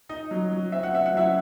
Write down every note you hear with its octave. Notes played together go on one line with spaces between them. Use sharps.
D#4 D#5
F#3
F#3
C4 E5
F#5
C4 E5
F#5
F#3 E4 E5